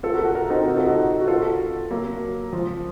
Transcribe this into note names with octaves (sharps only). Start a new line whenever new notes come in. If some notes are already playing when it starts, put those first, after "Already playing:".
F4 A4
F#4 A#4
F#4 A#4
F#4 A#4
C4 D#4
D#4 F#4
F4 A4
D#4 F#4
F#4
F4 A4
F#3 A#3
F3